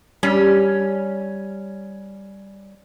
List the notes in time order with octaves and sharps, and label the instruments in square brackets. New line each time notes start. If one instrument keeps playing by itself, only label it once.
[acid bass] G3 [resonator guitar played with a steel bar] C#4 [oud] G4